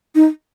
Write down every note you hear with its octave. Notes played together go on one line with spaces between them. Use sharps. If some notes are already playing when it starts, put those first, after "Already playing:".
D#4